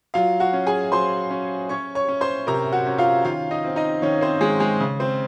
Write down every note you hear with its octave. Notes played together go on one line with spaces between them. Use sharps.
F#3 F4 F5
F#4 F#5
C#4
G#4 G#5
F#3 C5 C6
C#4
C#4 C#5 C#6
C#5 C#6
C#4
C5 C6
C3 A#4 A#5
F#4 F#5
C#4
F4 F5
D#3 F4 F5
D#4 D#5
C4
D#4 D#5
D#3 C#4 C#5
C4 C5
D#3 G#3 G#4
G#3 G#4
C#3
C4 C5